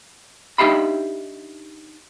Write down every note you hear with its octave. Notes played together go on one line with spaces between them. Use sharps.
D4 D#4 G4 E5 F5 B5